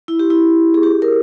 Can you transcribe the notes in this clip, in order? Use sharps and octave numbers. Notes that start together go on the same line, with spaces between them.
E4
G4
E4
G#4
G4
A#4